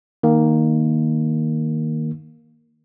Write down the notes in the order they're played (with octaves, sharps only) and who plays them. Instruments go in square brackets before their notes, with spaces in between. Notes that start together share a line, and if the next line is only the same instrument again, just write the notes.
[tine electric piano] D#3 A#3